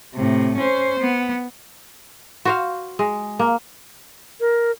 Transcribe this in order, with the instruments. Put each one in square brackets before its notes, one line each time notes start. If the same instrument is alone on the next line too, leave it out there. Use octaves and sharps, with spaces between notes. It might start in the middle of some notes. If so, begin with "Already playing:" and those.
[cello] A2 C3
C#4 C5
B3
[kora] F#4 C5 F5
G#3
A#3
[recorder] A#4